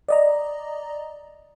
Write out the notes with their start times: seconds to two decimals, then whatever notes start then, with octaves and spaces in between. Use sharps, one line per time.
0.08 D5 D#5 A#5